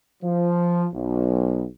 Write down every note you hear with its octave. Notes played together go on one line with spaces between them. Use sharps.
F3
B1